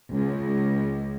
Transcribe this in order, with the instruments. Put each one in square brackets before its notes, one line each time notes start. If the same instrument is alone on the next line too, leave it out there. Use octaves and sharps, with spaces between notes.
[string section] C#2